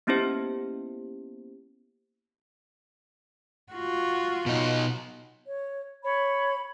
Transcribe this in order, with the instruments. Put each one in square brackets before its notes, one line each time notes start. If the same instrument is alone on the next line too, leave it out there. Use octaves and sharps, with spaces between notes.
[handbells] A#3 B3 C#4 E4 G4 C5
[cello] F4 F#4
[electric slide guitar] B2 D#4
[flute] C#5
[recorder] C#5 [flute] B5